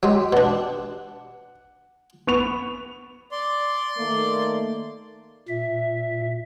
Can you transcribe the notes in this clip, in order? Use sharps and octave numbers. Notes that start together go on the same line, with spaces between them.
F#3 G#3 G4
B2 D4 F#5
B3 C#6 F7
D5 C6
D#3 A3 A#3
A#2 E5